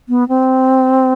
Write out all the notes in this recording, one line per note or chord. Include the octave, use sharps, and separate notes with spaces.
B3
C4